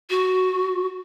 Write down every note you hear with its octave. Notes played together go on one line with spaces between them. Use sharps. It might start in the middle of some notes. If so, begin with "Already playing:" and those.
F#4